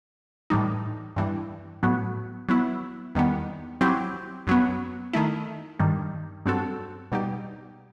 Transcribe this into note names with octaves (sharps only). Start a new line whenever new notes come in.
A2 E3 G3 D#4
G2 E3 G3
A2 F#3 B3 F#4
F#3 B3 E4
E2 D#3 G3 B3
F#3 C4 E4 G4
F#2 F#3 B3
D#3 A3 E4
G2 D#3 G3
G2 F#3 C4 F#4 A4
B2 G3 D#4 G4